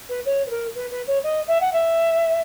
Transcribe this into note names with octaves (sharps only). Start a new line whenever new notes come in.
B4
C#5
B4
A#4
B4
B4
C#5
D#5
E5
F#5
E5